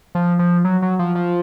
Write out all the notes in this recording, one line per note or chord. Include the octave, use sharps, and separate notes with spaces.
F3
F3
F#3
F#3
F3
F3